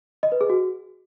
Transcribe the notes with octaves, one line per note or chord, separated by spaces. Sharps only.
D#5
B4
G#4
F#4